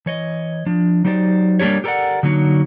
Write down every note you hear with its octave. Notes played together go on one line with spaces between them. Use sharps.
E3 C#5 D#5
F3 D4
F#3 D#4 G4 C5 D5
G3 A#3 D4 G4 C#5
G4 A4 A#4 C#5 D5 F#5
D3 F#3 A#3 D#4 C#5